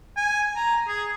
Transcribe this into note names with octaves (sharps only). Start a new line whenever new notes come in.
G#5
A#5
G#4